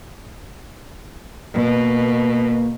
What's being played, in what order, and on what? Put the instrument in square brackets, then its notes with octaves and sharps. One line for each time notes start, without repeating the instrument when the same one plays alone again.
[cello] B2 [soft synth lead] A#3